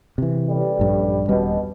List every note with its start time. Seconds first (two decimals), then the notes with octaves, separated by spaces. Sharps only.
0.18 C3 E3
0.48 A1 G3
0.79 A#1 G2
1.28 D#1 B2 G3 C#4